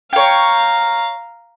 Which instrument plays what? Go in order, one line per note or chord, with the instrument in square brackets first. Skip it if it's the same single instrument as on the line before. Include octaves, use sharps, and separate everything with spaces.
[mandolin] C#5 G5 [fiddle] F5 A#5